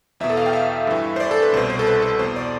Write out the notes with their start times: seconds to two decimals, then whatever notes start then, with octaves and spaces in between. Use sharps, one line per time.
0.20 E2 E5
0.24 B2
0.30 A4
0.37 F5
0.46 G5
0.53 E5
0.87 G2 E3
1.16 C5
1.20 D5
1.31 A4
1.42 B4
1.52 C2 B2 C5
1.70 C5
1.79 A4
1.87 B4
2.02 A4
2.19 E2 B2 C5
2.36 D5